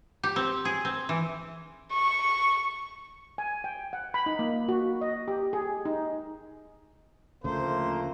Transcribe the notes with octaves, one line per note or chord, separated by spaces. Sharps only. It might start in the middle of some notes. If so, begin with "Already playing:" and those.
G4
C4
G#4
C4
E3
C#6
G#5
G5
F#5
B5
D#4
A#3
F#4
D#5
G4
G#4
D#4
D2 C#3 F3 A3 A#3 C5